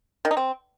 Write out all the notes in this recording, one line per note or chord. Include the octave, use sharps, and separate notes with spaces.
D#3
D#4
C4